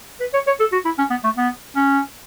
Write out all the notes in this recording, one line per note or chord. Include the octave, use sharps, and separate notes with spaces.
B4
C#5
C#5
A4
F#4
E4
C#4
B3
A3
B3
C#4